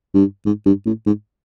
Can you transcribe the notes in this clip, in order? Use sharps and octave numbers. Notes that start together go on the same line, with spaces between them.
G2
G#2
G2
A2
G#2